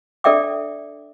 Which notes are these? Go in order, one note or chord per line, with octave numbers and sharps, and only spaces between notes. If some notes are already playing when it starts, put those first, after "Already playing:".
D4 A4 D5 E5 G5 D6